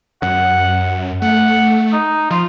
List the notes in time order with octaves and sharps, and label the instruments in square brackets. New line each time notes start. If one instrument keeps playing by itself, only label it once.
[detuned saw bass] F#2 [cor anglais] F#5
[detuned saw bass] A3 [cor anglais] F#5
[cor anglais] D#4
[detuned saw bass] F3 [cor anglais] F4